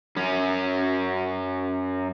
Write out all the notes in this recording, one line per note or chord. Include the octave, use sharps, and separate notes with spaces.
F#2 C#4